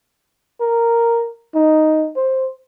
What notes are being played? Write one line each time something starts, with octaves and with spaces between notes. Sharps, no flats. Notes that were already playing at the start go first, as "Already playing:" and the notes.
A#4
D#4
C5